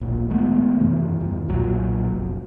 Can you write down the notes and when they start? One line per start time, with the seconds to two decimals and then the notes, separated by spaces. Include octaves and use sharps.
0.01 D1 A#1 A#2
0.30 D#3 G#3 A3 B3
0.77 F#2 C3 D#3 E3
1.20 E2 G2 D#3
1.48 B1 A#2 F3 F#3
2.09 F1